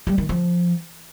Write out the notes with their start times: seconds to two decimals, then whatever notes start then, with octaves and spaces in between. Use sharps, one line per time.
0.07 G3
0.18 D#3
0.29 F3